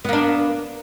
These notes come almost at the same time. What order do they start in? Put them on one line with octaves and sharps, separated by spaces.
B3 A#3 D4